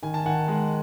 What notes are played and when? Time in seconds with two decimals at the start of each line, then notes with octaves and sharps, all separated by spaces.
0.02 D#3 G#5
0.14 A5
0.25 D#3 F#5 G#5
0.48 G#3